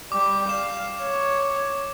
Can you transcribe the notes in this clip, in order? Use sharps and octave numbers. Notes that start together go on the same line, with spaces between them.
G3 D6
F5 E7
C#5